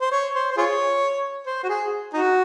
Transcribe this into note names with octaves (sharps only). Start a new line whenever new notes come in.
C5
C#5
C5
C5
F4 G#4 C#5
C5
F#4
G#4
D#4 F#4